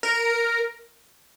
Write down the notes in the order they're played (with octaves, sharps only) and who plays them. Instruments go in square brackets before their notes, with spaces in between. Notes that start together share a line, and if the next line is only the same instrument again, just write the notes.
[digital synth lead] A#4